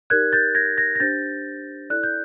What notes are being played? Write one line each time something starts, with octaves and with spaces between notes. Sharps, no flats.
D#4 G4 A#4 D5 F#6 G#6
G6 A6
G#6 A#6
G#6 A#6
A#6
D4 G4 C5 G6 A6
E4 A4 D5 F#6
G6